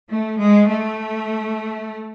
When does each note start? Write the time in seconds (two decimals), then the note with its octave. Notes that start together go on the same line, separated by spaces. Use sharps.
0.10 A3
0.39 G#3
0.69 A3